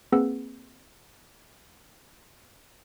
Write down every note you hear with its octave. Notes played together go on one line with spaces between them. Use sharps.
A#3 C4 G#4 B4 F#5 E6